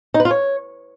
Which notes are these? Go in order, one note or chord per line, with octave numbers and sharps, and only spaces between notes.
D#4
B4
F4
C#5